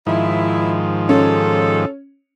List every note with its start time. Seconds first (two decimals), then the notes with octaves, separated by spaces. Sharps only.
0.07 G#2 D#3 F3 E4
1.09 C#4 F4 G4 A4